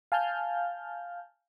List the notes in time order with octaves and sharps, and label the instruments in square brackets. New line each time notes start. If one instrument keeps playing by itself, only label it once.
[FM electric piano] F5 G#5 A5 F6 G6